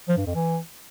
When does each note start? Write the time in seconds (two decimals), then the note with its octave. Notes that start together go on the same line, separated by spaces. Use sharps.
0.09 F3
0.17 G2
0.26 F2
0.35 E3